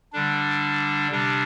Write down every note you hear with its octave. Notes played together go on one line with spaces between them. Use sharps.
D3 G3 D4
C3 G3 D4